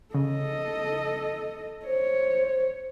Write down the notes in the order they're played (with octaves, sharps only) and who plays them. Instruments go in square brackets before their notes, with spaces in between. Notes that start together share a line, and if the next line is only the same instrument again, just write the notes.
[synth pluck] C#3 [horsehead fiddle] A4 D#5
[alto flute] C5 [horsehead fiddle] C#5